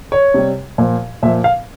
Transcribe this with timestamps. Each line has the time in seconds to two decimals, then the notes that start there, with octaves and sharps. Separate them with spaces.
0.12 C#5
0.34 C3 G3
0.78 A#2 F3
1.23 A#2 F3 E5
1.44 F5